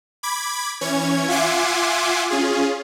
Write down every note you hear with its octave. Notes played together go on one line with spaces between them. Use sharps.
B5 D6 G#6
E3 C#4 C#5 G#6
F4 E5 F#5 G#5 C6 D6
C#4 F4 G#4